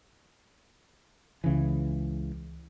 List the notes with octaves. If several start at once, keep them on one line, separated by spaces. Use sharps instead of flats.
C#2 C#3 E3